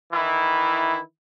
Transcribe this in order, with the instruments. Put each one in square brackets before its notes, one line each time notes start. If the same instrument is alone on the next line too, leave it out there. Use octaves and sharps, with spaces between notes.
[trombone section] D#3 E3 E4